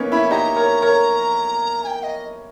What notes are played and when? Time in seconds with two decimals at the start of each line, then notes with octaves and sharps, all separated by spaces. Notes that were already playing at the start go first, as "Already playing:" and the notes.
Already playing: A#3 B3 C#4 D#4
0.12 C#4 E4 B5
0.31 D#4 G4 A#5
0.56 A#4 C#5
0.82 A#4 C#5
1.84 G#5
1.87 G5
2.03 D#5